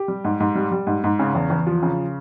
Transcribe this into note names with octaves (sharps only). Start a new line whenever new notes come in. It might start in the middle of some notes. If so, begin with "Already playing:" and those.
Already playing: G4
G3
G#2
G#2
G3
G3
G#2
G#2
C#3
E2
E2
F3
C#3